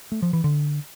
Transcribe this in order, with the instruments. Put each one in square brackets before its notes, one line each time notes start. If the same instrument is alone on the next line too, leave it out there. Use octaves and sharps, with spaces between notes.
[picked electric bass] A3
F3
E3
D3